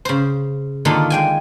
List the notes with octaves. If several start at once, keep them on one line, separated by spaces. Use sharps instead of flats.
C#3 C5
D3 D#3 A#3 F4 A4 D#5
G#3 G5 G#5